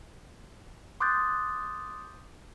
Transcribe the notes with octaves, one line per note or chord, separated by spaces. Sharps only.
C6 D6 D#6 F#6 G6 A6